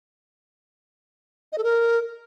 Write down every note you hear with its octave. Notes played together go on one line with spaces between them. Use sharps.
D#5
A4
A#4